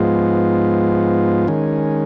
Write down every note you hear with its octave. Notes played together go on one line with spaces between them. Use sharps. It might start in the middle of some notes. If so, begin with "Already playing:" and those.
Already playing: G#2 F3 G#3 B3 F4
D#3 G#3 C#4